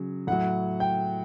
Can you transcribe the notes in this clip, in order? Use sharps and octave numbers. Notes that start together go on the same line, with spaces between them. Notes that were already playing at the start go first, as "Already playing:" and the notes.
Already playing: C#3 F#3
A2 F#3 F#5
G5